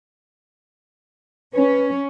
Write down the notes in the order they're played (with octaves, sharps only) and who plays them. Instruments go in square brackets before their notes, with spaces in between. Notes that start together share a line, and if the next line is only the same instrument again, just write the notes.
[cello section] C#4 [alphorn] B4